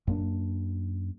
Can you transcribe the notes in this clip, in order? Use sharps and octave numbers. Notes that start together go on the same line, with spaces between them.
F#2 A#3 D4